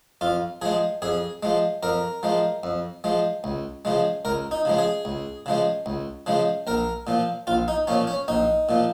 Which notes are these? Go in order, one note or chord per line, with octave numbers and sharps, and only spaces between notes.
F2 F4
F3 G#3 G#4
F2 G#4
F3 G#3
F2 A#4
F3 G#3
F2
F3 G#3
C#2
C#3 F3 G#3
C#2 A#4
D#4
C#3 F3 G#3
G#4
C#2
C#3 F3 G#3
C#2
C#3 F3 G#3
A#1 A#4
A#2 F3
A#1 F4
D#4
A#2 F3 C#4
C#4
A#1 D#4
A#2 F3